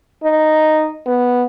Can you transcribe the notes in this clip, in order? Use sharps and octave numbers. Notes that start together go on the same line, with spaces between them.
D#4
B3